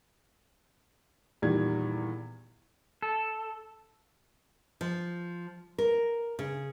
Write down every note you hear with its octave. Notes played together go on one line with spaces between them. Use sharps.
E2 A#2 D#3 G3 G#6
A4
F3
A#4
C#3